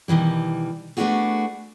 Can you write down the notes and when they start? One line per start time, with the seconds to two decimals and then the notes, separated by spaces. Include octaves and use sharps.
0.08 B2 D#3 E3 G3
0.97 A3 B3 D4 F4 F#4 G#4